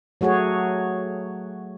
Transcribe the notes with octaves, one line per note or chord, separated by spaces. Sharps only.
F#3 A3 F#4 G#4 C#5